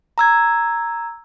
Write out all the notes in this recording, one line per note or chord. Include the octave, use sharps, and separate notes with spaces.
A#5 E6 G#6